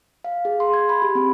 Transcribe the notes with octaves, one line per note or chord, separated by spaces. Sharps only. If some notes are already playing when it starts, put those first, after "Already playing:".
F5
G#4
C6
G#6
B5
G4
C4